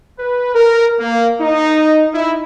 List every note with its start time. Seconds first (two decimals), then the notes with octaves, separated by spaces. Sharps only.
0.19 B4
0.55 A#4
1.00 A#3
1.40 D#4
2.14 E4